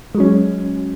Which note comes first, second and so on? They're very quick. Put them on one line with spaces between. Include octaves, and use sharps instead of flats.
G#3 F#3 C#4